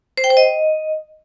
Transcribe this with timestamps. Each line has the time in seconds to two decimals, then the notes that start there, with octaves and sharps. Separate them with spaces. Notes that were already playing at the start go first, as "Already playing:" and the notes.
0.17 C5
0.24 G5
0.30 C5
0.37 D#5